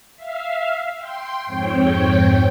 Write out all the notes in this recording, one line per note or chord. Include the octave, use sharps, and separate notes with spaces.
E5 F5
G5 C6
F2 G#2 C4 C#5 G5